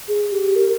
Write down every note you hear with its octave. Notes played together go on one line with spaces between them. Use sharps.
G#4
G4
A#4